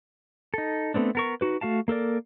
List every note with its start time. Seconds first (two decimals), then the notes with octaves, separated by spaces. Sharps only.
0.54 D#4 A4
0.94 A3 B3 C4 D4
1.15 B3 A#4 C#6
1.41 D#4 F#4 B4
1.61 A3 F#4 F5 A5
1.88 A#3 A4 A#4 D5